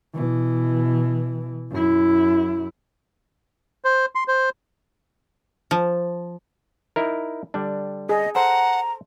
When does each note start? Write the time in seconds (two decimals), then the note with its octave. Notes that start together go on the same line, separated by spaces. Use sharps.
0.14 B2 E3
1.71 F#2 E4
3.84 C5
4.15 C6
4.28 C5
5.71 F3
6.96 D#4 E4 A#4
7.54 D3 G3 D4
8.09 G#4 D#5
8.35 A4 C5 F#5 A#5